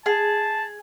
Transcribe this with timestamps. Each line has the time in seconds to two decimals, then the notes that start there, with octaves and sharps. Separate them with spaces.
0.06 G#4 A5